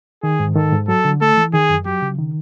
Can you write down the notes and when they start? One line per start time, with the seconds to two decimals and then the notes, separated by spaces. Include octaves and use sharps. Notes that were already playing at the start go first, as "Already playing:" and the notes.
0.23 D#3 G#4
0.40 G#2
0.56 D#3 A4
0.72 G#2
0.88 F#3 A4
1.05 D3
1.21 A3 A4
1.37 E3
1.54 D#3 G#4
1.70 F#2
1.86 F#3 G4
2.02 C#3
2.19 D#3